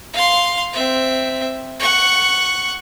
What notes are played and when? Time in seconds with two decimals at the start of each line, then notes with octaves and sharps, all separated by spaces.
0.13 F5 C6
0.73 C4 E5
1.80 F#5 C#6